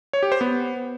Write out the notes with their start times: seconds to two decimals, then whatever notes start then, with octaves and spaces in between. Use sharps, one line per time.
0.13 C#5
0.23 G4
0.32 C5
0.41 B3